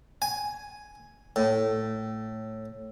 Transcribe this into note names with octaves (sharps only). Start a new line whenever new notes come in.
G#5
A2